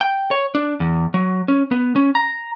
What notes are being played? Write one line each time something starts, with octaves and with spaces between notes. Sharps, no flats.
G5
C#5
D4
E2
F#3
C#4
B3
C#4
A#5